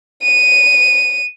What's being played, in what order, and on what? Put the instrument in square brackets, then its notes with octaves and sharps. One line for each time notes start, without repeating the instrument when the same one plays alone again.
[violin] D#7